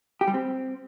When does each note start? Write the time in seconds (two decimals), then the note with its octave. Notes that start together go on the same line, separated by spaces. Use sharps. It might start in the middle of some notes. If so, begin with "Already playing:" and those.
0.21 G4
0.28 G3
0.34 C4